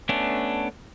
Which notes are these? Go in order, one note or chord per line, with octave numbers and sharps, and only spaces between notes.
A3 B3 C#4 D4